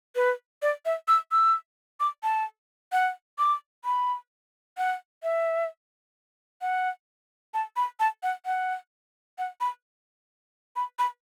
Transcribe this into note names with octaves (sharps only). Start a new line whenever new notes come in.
B4
D5
E5
E6
E6
D6
A5
F#5
D6
B5
F#5
E5
F#5
A5
B5
A5
F#5
F#5
F#5
B5
B5
B5